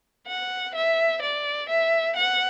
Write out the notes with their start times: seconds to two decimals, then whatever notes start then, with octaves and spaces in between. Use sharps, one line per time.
0.27 F#5
0.75 E5
1.22 D5
1.70 E5
2.17 F#5